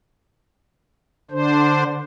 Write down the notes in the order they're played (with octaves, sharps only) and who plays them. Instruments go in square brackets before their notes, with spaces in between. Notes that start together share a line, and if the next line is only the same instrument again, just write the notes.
[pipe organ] D3 D4 C5